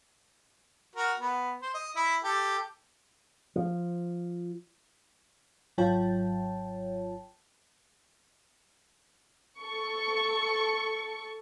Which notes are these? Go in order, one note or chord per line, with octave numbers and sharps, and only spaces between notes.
F#4 A#4
B3
C5
D#5
E4
G4 A4
F3
G#1 F#3 F4 C#5 G5 A5
A4 C#6